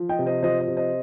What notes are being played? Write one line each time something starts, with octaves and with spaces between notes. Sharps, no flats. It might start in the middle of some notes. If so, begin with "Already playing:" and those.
Already playing: F3
D#5 G5
C3
C5 D#5
F3 C5 D#5
C5 D#5
C3
C5 D#5